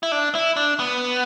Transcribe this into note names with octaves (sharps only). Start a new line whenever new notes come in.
E4
D4
E4
D4
B3